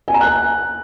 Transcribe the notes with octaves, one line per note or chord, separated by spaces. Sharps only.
G#5
A#5
F#6